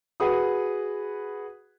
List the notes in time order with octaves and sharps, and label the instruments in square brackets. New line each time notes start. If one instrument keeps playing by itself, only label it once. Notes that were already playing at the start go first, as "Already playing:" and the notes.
[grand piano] F#4 G#4 B4 F#5 D#6